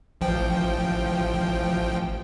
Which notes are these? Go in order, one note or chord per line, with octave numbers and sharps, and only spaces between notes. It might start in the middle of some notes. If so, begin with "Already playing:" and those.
A1 F3 G5